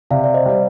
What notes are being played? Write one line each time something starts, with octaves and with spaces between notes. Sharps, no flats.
C3 D5 F5
D5
C5 D#5
G3